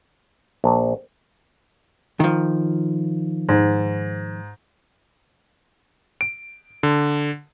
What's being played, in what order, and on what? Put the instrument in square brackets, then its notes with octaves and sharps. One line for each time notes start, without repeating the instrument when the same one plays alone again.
[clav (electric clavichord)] A#1
[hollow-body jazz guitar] D#3 F3
[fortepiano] G#2
[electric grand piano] D7
D3